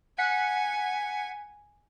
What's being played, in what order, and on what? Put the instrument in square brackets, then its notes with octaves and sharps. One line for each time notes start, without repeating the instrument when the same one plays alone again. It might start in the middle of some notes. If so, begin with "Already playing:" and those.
[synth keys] F#5 B6 C#7 [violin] G#5